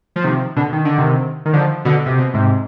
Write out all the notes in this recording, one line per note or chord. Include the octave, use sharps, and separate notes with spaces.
F3
C3 D#3
B2 D3
D#3
D3
C3 D#3
D#3
D3 F3
B2 D3
C3
B2
G#2 C3